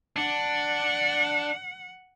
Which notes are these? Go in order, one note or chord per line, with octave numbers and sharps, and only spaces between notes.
D4 F#5